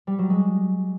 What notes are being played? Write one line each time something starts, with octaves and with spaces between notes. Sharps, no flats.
G3
F#3
G#3